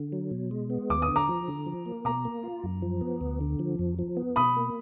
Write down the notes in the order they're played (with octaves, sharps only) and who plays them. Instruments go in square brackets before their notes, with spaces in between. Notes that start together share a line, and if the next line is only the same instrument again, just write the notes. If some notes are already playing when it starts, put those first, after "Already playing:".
Already playing: [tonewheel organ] D3
F#3
B2
G#3
B3
[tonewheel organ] D#2 [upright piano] D6
[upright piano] D#6
[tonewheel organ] D3
[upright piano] A#5 D6
[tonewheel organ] F3
D3
F3
A#3
[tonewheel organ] B2 [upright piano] A#5 D6
[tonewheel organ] A#3
F4
F#2
F3
B3
D2
D3
F3
F2
F3
B3
[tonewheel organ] B2 [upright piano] B5 D#6
[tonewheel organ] A#3